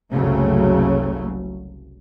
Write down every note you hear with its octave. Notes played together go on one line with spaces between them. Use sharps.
F#1 C2 C#3 F#3 A3